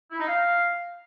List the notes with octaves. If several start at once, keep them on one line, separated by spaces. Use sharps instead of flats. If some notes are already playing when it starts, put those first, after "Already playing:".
E4
D#4
F5